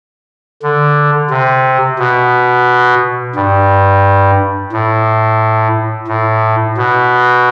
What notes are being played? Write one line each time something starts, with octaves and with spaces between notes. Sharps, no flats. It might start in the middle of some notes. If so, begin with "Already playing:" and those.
D3
C3
B2
G2
A2
A2
B2